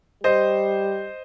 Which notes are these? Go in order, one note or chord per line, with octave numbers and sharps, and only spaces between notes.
G3 C5 D#5